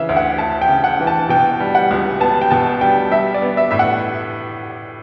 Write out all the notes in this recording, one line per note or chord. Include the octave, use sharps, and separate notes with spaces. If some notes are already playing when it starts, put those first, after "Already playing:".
Already playing: C#3 E3 E5
D2
F#5
D2 A5
G5
C#3
F#5
E3
A5
B2 G5
G3
F#5
C#2
B3 A5
G5
B2 A5
G3 G5
G3 E5
D5
B3
E5
A2 E5
F#5